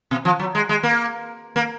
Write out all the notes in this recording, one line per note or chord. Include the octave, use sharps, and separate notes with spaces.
B2
F3
F#3
G#3
G#3
A#3
A#3